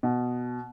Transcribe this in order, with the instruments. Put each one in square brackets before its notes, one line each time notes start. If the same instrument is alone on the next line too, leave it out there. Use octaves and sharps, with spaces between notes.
[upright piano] B2